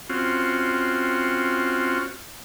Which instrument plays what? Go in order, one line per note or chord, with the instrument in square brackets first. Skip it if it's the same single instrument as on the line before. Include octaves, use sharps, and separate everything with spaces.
[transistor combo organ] C4 C#4 F4 F#4